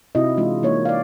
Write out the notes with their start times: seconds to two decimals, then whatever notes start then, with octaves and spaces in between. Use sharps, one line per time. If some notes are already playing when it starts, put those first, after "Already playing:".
0.15 C3 C4 D#4 E4 F#4 D#5
0.37 E3 G#3 D4 F4
0.63 E3 A#3 D#4 C#5
0.85 D5 F5